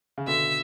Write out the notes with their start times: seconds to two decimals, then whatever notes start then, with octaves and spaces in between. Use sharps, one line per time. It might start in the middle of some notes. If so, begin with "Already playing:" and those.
0.18 C#3
0.27 B2 D3 E5